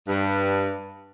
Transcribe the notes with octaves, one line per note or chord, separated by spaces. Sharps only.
G2